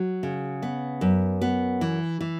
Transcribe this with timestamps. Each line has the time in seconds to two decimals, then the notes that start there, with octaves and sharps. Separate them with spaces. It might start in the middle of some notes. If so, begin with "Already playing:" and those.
Already playing: F#3
0.23 C#3
0.62 B3
1.01 F#2
1.41 B3
1.81 E3
2.21 E3